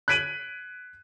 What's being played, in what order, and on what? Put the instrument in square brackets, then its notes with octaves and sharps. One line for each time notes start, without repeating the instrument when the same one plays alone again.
[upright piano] F#6 G#6 B6 D7 D#7 F#7